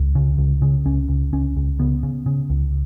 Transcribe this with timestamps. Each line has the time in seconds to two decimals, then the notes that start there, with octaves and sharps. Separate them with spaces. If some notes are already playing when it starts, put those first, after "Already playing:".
Already playing: C#2
0.15 C#3
0.38 C#2
0.62 C#3
0.85 C#2 C#4
1.09 C#2
1.33 C#2 C#4
1.56 C#2
1.79 C#3 B3
2.03 C#3
2.26 C#3
2.50 C#2